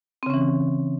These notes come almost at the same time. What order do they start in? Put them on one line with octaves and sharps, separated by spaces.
C4 C#3 C#4 E3